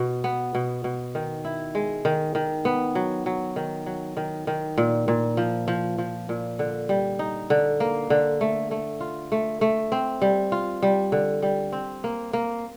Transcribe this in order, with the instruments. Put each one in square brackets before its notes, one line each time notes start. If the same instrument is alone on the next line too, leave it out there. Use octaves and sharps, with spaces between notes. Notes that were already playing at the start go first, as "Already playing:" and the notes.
Already playing: [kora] B2
B3
B2
B2
D#3
E4
G#3
D#3
D#3
B3
F#3
F#3
D#3
F#3
D#3
D#3
A#2
A#2
F3
F3
F3
A#2
D3
G3
D#4
D3
A#3
D3
A3
A3
F4
A3
A3
C4
G3
F4
G3
D3
G3
C4
A#3
A#3